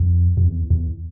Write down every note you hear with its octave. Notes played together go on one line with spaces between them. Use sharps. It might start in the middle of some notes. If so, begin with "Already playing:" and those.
Already playing: F2
F2
E2
E2